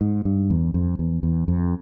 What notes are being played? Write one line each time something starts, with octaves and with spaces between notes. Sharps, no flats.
G#2
G2
E2
F2
E2
E2
F2